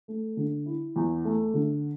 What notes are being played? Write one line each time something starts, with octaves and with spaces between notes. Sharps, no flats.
A3
D3
E4
E2
A3
D3